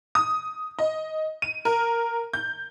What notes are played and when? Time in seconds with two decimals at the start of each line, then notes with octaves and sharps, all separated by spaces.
0.15 D#6
0.79 D#5
1.42 D#7
1.65 A#4
2.33 G6